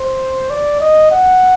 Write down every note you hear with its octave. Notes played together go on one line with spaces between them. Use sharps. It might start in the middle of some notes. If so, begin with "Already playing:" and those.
Already playing: C5
D5
D#5
F#5